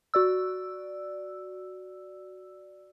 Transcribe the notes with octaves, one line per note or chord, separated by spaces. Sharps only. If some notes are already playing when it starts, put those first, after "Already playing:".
F#4 D5 E6